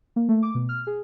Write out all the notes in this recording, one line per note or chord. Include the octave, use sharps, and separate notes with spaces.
A#3
A3
D6
B2
F6
G#4